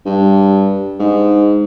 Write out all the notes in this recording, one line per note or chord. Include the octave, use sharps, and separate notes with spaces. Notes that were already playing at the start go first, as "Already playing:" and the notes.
G2
G#2